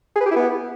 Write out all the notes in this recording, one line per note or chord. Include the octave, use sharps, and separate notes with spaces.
G#4
B4
G4
E4
B3